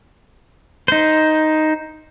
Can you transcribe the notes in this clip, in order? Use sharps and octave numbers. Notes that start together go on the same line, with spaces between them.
D#4 C5